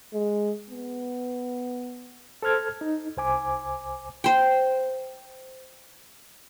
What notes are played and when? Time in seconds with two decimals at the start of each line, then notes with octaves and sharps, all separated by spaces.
0.13 G#3
0.70 B3
2.42 A4 C5 F6 G#6
2.81 D#4
3.17 C2 C5 G#5 D6
4.24 C5 G5